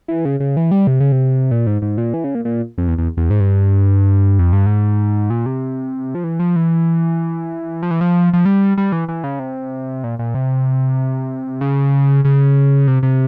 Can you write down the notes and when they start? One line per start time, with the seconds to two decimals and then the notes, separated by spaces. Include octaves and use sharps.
0.08 E3
0.25 C#3
0.40 C#3
0.57 E3
0.71 G3
0.87 C3
1.00 C#3
1.12 C3
1.51 A#2
1.67 G#2
1.82 G#2
1.98 A#2
2.14 E3
2.24 C#3
2.35 A#2
2.45 A#2
2.78 F2
2.88 E2
2.98 E2
3.17 E2
3.30 G#2
3.40 G2
4.39 F2
4.53 G2
4.66 G#2
5.30 A#2
5.46 C3
6.15 F3
6.24 E3
6.40 F3
6.56 E3
7.83 F3
7.91 E3
8.01 F3
8.33 F3
8.46 G3
8.78 G3
8.92 E3
9.08 E3
9.24 C#3
9.39 C3
10.04 A#2
10.19 A#2
10.34 C3
11.61 C#3
12.25 C#3
12.87 C3
13.03 C3